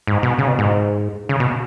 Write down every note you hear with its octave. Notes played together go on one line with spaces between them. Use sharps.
G#2
B2
C#3
B2
G#2
C#3
B2